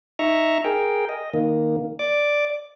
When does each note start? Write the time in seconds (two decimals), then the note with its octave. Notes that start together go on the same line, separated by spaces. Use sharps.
0.19 D#4 E5 A#5 C#6
0.64 G#4 A#4 G5
1.09 D#5
1.34 D#3 A#3
1.99 D5 D6